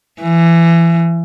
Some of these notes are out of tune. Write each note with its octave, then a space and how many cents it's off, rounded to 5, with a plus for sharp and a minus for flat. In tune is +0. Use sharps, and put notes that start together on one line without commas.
E3 +25